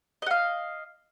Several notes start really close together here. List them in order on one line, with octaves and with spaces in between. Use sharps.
D#5 F#5 F5